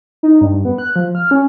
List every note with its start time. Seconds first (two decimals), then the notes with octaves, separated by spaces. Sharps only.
0.23 D#4
0.41 G2
0.65 B3
0.78 F#6
0.96 F3
1.15 F6
1.31 C#4